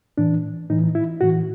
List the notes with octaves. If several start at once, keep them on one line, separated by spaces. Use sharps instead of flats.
A2 E3 D4
A2 E3 D#4
E4
A2 E3 F#4